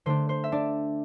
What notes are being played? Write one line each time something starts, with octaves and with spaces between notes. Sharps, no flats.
D3 A3 D4 C5
C5
E5
D4 D5